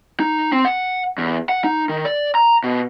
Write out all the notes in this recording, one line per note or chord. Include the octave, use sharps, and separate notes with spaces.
D#4
C4
F#5
E2
F#5
D#4
D#3
D5
A#5
B2